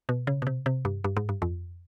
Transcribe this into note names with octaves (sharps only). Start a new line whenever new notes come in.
B2
C#3
B2
C3
C3
G2
G2
G#2
G2
F2